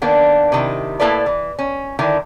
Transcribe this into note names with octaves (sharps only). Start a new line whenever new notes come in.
D#3 A#3 B3 D4
C3 D#3 E4
A2 A#3 E4 A4 B4 D5
E3
C#4
D3 D#3 E4